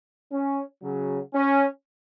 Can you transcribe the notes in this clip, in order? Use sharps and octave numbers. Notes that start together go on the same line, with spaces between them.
C#4
C#3 F#3
C#4